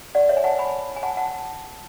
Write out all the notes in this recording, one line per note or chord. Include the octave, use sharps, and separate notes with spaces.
D5 F#5
C#5 E5
G#5
F#5 A5
G#5 B5
G#5
F#5 A5
F#5 A5